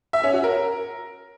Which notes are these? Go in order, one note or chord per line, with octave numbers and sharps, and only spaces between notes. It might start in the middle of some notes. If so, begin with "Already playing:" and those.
E5
C#4
F#4
A#4